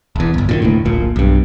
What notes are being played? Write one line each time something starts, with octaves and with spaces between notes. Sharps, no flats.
E1 E2
D1 G1
A#2 D3 D#3
F1 D2 A2
D1 A#1 A#2
B1 G2